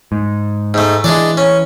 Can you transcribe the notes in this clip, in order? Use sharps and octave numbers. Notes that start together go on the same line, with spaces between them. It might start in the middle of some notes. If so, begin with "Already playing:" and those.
G#2
G#2 A3
E3 G#3 D4 D5
C#4